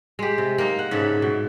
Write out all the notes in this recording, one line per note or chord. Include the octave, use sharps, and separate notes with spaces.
G#3 G4
C3
A#3 D#4
F#5
G#2 C#3 A4 E5
B2